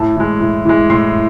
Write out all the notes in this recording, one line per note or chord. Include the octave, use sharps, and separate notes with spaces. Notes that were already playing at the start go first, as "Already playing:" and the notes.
Already playing: A2 A5
E3 G#3
A2
E3 G#3
A2 C6